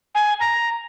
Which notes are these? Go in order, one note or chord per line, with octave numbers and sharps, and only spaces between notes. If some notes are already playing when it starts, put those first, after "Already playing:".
G#5
A#5